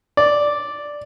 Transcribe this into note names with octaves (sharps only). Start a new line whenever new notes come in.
D5